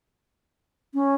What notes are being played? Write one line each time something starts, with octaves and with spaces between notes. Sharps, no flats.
C#4